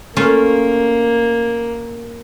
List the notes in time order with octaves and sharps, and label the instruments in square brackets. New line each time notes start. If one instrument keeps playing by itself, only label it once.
[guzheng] A3 C#4 F4 [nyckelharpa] A#3